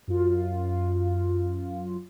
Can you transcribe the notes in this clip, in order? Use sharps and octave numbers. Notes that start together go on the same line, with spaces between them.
F#2 F4